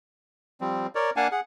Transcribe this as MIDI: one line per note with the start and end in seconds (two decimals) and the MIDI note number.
0.61 0.87 53
0.61 0.87 55
0.61 0.87 60
0.95 1.10 70
0.95 1.10 73
0.95 1.10 74
1.16 1.28 58
1.16 1.28 62
1.16 1.28 77
1.16 1.28 78
1.16 1.28 80
1.16 1.28 81
1.32 1.40 68
1.32 1.40 78